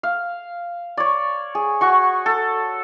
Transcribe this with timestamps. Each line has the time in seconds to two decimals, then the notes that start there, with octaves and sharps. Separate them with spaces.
0.03 F5
0.97 C#5 D5
1.55 G#4
1.81 F#4 C#6
2.26 A4